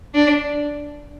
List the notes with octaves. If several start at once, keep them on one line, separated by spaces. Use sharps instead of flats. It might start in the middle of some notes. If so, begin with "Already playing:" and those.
D4